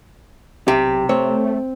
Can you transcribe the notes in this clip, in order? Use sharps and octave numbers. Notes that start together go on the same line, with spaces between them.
B1 C3 G4
A3 C4 C#5